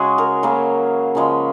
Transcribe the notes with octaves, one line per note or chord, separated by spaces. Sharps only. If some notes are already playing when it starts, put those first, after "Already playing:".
Already playing: C#3 G#3 F#4 G#4
A#4
C#3 F#3 A#3
C#3 F3 G#3